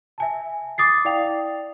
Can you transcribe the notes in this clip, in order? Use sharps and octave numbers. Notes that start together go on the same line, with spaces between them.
E5 G#5 A5
D6 D#6 A6 C7
E4 D5 F5 G5 F7